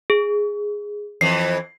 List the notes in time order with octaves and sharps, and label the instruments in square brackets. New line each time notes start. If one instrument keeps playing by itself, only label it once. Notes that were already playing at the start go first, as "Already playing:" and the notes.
[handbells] G#4
[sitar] F2 E3 [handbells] C7